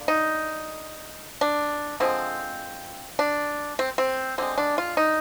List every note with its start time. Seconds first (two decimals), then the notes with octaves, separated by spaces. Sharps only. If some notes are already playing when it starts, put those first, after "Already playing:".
Already playing: D3 A#3
0.08 D#4
1.41 D4
2.00 D3 F3 G#3 C4
3.19 D4
3.79 C4
3.98 C4
4.38 D3 G#3 C4
4.58 D4
4.78 F4
4.97 D#4